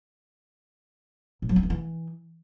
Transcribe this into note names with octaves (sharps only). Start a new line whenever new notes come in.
A2
F#3
C4
D#3
E3